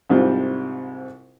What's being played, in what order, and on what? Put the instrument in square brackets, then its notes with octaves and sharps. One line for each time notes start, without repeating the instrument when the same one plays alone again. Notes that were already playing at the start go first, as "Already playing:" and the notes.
[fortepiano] C2 G#2 C3 G3 F4